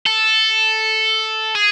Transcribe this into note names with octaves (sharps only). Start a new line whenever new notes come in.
A4
G#4